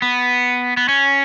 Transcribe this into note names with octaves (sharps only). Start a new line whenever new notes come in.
B3
B3
C#4